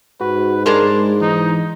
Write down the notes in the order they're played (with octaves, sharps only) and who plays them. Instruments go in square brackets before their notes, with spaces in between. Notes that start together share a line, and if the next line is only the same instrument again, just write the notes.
[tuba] G#2 [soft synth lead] F#4 [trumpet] B4
[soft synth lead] G#3 [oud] D4 G#4 A#4 [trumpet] C6
[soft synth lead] E3 [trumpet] D#4